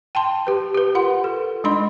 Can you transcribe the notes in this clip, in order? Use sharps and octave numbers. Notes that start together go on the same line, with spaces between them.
G5 A5 C6
G4 B4
G4 B4
F4 A#4 F#5 C6
A4
G#3 D4 D#4 D#5 B5 C6